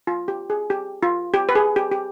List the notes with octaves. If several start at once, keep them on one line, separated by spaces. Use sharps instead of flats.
F4
G4
G#4
G4
F4
G4
B4
G#4
G4
G4